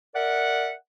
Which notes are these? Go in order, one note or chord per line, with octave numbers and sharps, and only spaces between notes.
A#4 D5 E5 F#5